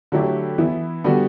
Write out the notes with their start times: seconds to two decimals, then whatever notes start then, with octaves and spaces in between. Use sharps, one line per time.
0.12 D3 F#3 A3 E4 G4
0.58 E3 B3 E4
1.04 D3 G3 B3 F#4